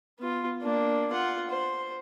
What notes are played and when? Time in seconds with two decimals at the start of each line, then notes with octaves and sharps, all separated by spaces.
0.19 B3 F4
0.62 A#3 D4
1.12 F4 F#5
1.50 C5